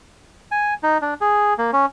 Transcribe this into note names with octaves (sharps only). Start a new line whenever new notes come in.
G#5
D#4
D4
G#4
A#3
C#4